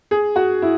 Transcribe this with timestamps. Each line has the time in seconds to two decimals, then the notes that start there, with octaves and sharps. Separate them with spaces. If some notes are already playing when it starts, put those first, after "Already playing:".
0.11 G#4
0.36 F#4
0.62 E4